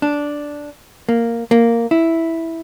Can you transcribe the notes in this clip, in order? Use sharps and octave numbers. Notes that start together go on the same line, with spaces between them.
D4
A#3
A#3
E4